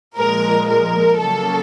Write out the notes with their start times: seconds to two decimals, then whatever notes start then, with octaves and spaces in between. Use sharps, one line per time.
0.17 A#2 F3 G#3 A#4
0.68 A#4
1.19 C#3 F#3 A#3 A4